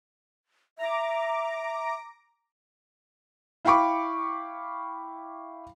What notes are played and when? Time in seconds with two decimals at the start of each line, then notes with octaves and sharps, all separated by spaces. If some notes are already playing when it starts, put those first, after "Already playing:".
0.79 E5 A#5 D6
3.65 E4 F5 G5 B5 C#6 D6